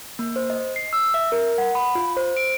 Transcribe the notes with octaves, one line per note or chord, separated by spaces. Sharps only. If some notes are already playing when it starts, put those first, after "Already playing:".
A#3
C5
D#5
C7
E6
E5
A#4
F#5
B5
F4
C5
D7